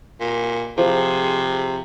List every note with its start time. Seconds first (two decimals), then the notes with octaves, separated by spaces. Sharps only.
0.20 A#2
0.78 C3 F3 G#4